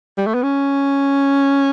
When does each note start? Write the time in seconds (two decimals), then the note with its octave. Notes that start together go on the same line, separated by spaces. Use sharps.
0.18 G3
0.27 A3
0.34 B3
0.43 C#4